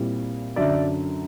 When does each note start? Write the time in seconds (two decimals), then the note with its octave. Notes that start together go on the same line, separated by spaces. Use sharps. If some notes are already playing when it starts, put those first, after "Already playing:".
Already playing: A#2 G3 C4 E4
0.56 F#2 D3 F#3 D5 E5